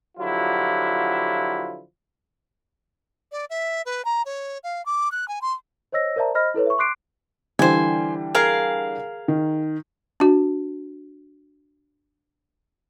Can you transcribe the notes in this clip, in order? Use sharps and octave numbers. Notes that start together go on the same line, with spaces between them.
D3 F3 F#3 E4 F4 G4
D5
E5
B4
A#5
C#5
F5
D6
F#6
G#5
C6
C5 C#5 D#5 E6 A#6
A#4 C5 D5 E5 A5 A#5
C5 D#5 B5 F6 A#6
E4 A4 B4 C#5
E5 C#6
C6 D6 F#6 C7 D7
D3 E3 G3 C5 G#5
G#4 A#4 F5
D#3
D4 F#4